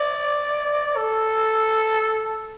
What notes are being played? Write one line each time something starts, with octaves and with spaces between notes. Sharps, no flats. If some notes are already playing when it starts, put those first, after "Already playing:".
Already playing: D5
A4